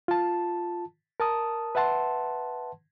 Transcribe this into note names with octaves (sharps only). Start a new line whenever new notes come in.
F4 A5
A#4 A5 D#6
B4 E5 F#5 A5 C6